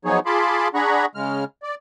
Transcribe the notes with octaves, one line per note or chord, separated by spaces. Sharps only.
F3 F#3 B3 D#4 G#4 C#5
F4 G#4 A5 B5 C6 D6
D4 G#4 F#5 A#5 B5 C#6
C#3 G#3 F6
D5